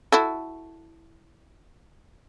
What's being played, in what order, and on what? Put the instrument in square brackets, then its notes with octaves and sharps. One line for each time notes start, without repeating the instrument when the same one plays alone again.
[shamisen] E4 F#4 A4